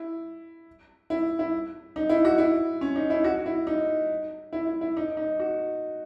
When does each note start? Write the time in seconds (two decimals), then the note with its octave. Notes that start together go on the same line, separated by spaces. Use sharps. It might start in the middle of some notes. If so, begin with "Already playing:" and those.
Already playing: E4
1.10 E4
1.39 E4
1.96 D#4
2.09 E4
2.25 F#4
2.38 E4
2.81 C#4
2.96 D#4
3.10 E4
3.24 F#4
3.46 E4
3.67 D#4
4.53 E4
4.67 E4
4.81 E4
4.97 D#4
5.17 D#4
5.40 F#4